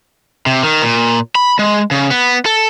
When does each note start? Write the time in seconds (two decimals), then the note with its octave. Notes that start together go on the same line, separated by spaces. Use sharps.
0.46 C3
0.63 D#3
0.82 A#2
1.35 B5
1.59 G#3
1.91 C#3
2.11 B3
2.46 A4